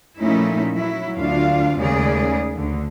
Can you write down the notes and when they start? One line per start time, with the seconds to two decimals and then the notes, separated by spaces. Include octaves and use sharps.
0.18 A#2 F3 A3 C#4 D#4 E4
0.74 F#3 E4
1.17 D2 D4 F4 F5
1.76 D#2 C#3 G#3 A3 G#4 D5
2.54 D2 D3